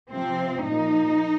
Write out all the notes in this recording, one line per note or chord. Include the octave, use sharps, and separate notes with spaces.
C3 F3 C4
A#2 F3 D#4